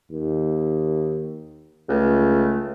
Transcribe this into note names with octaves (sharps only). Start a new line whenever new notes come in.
D#2
C#2 A3